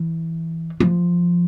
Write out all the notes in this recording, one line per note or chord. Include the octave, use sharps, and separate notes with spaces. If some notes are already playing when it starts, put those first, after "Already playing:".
Already playing: E3
F3